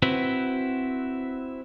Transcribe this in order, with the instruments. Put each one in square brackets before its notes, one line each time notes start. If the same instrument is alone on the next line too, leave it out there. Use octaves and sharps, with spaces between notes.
[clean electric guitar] C4 E4 F#4 B4